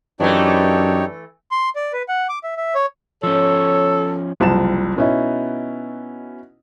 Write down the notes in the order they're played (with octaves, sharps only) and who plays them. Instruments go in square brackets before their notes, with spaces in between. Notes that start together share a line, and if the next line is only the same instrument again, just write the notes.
[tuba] F#2 [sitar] E3 A3 [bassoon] D4 [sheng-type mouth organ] D#4 G4 C#5
[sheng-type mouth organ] C6
D5
B4
F#5
D6
E5
E5
C#5
[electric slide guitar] F3 C#4 [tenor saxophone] A4 [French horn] C#5
[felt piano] F#1 C2 F3 A5 E7
B2 B3 C#4 D#4 E4